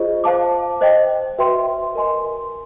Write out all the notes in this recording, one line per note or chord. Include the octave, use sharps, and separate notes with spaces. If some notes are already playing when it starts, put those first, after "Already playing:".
Already playing: F4 G#4 C5 D#5
C5 F5 A5 D6
C5 D#5 G5
F#4 B4 E5 G5 C6
A#4 D#5 G#5 C6